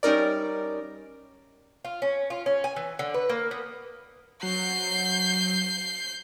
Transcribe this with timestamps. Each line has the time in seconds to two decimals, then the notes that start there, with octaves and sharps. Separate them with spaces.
0.03 G3 C#4 D#4 A#4 D5
1.85 F4
2.02 C#4
2.30 F4
2.46 C#4
2.64 G#5
2.76 E3
2.99 D3
3.14 B4
3.29 A#3
3.51 B3
4.43 F#3 G6 C7